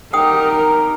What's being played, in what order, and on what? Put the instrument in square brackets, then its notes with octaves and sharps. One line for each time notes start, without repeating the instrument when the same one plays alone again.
[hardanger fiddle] D#4 G4 [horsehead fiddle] A#4 [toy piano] F#5 G5 D#6